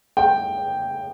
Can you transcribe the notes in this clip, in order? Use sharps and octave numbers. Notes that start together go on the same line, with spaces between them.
G5